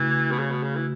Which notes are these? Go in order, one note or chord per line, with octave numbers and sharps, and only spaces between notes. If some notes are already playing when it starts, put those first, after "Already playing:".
Already playing: C#3 E3 A3 F#4
B2
C#3
B2
C#3
E3